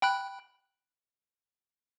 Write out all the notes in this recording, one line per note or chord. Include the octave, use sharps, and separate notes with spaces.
G5 B5 F#6